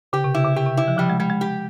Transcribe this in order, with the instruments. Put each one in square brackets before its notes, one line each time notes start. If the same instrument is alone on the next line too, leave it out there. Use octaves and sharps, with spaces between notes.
[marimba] C#3 [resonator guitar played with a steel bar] G4
[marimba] C3
[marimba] C#3 [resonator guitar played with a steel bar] E4
[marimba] C#3
[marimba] C3 [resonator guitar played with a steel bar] G4
[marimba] C3
[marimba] C#3 [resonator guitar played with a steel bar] E4
[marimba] F3
[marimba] F3 [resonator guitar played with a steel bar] G3
[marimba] G#3
[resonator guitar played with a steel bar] G3 [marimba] G#3
[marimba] G#3
[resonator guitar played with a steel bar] G4